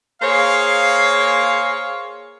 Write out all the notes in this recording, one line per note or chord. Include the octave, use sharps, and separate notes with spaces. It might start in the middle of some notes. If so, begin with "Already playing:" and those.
A#3 G#4 C5 C#5 F5